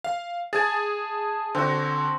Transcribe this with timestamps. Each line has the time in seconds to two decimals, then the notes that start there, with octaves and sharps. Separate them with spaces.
0.04 F5
0.53 G#4 G#5 A5
1.55 D3 C4 F#4